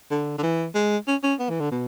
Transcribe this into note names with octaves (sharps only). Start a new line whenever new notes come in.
D3
D3
E3
G#3
C#4
C#4
B3
E3
D3
B2